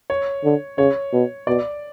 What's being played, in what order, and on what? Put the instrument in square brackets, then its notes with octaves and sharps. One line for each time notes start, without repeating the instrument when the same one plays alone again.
[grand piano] C#5
[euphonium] D3
[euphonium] C#3 [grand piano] C#5
[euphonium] B2
[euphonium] B2 [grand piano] D5